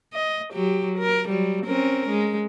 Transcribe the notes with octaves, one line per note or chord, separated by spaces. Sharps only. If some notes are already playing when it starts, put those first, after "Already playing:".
D#5
F#3 G4
A#4
F#3 G3
C4 C#4 A#4
G#3